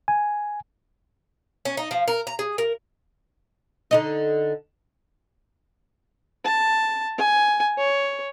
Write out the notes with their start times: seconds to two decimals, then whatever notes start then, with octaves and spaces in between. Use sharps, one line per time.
0.08 G#5
1.65 C#4
1.77 D#4
1.91 F3
2.08 A#4
2.27 A#5
2.39 G#4
2.58 A#4
3.91 D3 D#4 D#5
6.44 A5
7.18 G#5
7.78 C#5